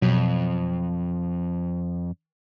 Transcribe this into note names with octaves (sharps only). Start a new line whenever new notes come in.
F2 B2 F#3